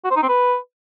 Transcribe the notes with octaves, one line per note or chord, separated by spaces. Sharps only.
F#4
C5
D#4
C4
B4